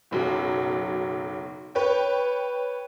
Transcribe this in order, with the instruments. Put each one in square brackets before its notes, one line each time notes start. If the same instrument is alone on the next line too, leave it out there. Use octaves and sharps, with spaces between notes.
[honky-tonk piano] F#1 B1 F#3
B4 C#5 G5